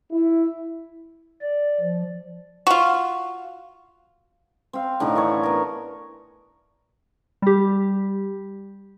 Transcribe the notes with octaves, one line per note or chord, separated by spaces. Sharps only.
E4
D5
F3
F4 F#4
C4 F5
A2 D3 D#3 D#4
E3 D4 C#5
B3 A#4
G3 G4